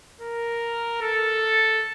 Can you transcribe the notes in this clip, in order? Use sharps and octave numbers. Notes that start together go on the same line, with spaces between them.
A#4
A4